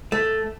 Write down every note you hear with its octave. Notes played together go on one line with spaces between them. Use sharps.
A3